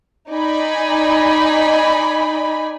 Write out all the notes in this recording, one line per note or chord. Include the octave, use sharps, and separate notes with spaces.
D#4 D5 G#5 B5